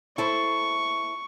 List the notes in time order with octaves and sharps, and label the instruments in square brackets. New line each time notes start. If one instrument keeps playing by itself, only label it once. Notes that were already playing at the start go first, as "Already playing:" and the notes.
[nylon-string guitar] E4 A4 C5 [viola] C#6